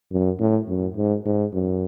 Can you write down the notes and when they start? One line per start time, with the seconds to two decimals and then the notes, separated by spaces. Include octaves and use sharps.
0.12 F#2
0.40 A2
0.68 F#2
0.96 G#2
1.26 G#2
1.53 F#2